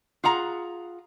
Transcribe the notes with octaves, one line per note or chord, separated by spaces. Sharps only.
F4 G#4 F#5 A#5